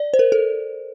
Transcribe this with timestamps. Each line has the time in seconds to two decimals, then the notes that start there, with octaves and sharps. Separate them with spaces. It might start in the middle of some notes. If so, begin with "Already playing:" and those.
Already playing: D5
0.14 C5
0.19 A#4
0.32 A4